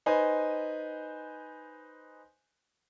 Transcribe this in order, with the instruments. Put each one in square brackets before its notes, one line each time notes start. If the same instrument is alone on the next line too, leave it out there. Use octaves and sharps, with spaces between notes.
[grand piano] D#4 B4 C5 G#5